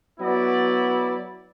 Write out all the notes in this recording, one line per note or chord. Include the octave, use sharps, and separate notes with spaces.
F#3 B3 E4 D5